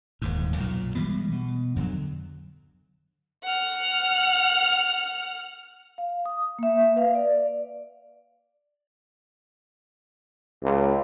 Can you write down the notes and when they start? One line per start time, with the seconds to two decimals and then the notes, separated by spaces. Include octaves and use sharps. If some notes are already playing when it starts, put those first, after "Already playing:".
0.22 D#1 D#2 G#2
0.58 B1 F#2 A#2
0.95 E3 G3 G#3 B3
1.32 B2
1.76 F2 D3 F#3
3.44 F#5 F6
5.98 F5
6.26 D#6
6.59 A#3 E5
6.96 B4 F5
7.15 D5
10.63 C#2